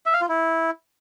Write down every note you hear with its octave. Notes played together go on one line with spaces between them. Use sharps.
E5
F5
F4
E4